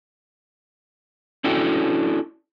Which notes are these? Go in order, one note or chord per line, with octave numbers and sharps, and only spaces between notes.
C#4 D4 E4 F#4 A4 G5